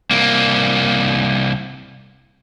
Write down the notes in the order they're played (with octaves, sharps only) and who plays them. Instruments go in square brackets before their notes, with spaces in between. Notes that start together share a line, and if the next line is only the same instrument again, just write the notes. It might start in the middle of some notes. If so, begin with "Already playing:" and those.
[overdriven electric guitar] C2 A#3